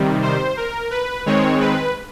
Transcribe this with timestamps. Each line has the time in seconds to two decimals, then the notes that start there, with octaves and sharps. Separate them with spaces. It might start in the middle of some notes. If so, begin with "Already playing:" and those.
Already playing: C3 D#3 G3
0.22 C5
0.57 A#4
0.91 B4
1.26 D#3 G#3 C4 C#5
1.60 B4